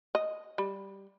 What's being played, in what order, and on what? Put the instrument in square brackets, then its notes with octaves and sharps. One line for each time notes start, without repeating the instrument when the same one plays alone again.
[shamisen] D#5
G3